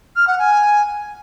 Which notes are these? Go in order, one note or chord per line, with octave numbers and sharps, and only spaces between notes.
F6
F#5
G#5